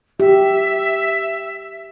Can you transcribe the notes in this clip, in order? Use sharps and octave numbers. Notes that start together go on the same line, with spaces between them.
G4 E5